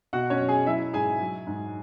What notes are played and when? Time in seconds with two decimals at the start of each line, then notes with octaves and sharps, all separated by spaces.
0.13 B2 F#4 F#5
0.30 C#4 C#5
0.39 F#3
0.48 G#4 G#5
0.66 F#3 E4 E5
0.93 G#2 G#4 G#5
1.21 F#3
1.47 G#2